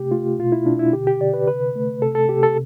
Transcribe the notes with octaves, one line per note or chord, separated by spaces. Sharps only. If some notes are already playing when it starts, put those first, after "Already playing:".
Already playing: C3 A3 G4
A3 F4
B2 F4
E4
B2 D4
E4
D3 G4
G4
D3 D5
B4
C3 B4
A3
C3 A4
A4
C3 G4
A4